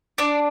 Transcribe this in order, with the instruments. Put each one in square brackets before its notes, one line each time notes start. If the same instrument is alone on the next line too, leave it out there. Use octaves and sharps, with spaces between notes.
[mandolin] D4 D5